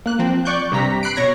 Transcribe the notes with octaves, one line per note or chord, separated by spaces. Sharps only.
A#3 F#6
F3 C4
D5 C#6 F#6 G6
G2 C3 A#5 B6
B5 F#6 C7 D7
B2 C#5 G#6 A#6